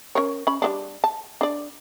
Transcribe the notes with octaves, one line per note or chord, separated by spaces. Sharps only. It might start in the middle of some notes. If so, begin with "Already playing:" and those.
C#4 A#4 C#5
C#4 B5
G3 B3 D4
A5
D4 D5